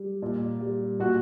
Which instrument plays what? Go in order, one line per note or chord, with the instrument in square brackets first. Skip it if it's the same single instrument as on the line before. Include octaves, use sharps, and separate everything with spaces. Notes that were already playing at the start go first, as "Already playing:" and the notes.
Already playing: [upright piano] G3
A#2
G3
A#2 F#4